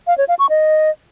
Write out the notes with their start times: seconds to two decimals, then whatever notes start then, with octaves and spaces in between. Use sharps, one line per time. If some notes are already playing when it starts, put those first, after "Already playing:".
0.07 F5
0.18 C#5
0.28 F5
0.39 C#6
0.50 D#5